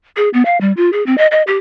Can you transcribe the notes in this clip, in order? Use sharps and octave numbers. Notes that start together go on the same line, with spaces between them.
G#4
B3
F5
G3
F4
G#4
C4
D#5
D#5
G4